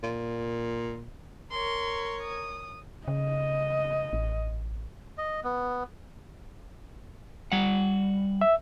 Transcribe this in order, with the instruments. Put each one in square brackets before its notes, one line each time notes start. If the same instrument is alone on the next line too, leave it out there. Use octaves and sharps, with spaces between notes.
[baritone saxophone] A#2
[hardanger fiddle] A#4 C#5 [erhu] C6
[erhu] D#6
[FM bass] C#3 [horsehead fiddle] D#5
[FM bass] A1
[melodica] D#5
B3
[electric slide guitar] G3 F#5
[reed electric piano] E5